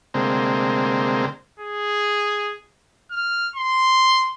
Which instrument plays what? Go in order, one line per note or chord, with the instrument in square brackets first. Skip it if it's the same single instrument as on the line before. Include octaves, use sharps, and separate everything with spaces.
[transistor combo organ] D2 C3 G#3 A#3 C4
[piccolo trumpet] G#4
F6
C6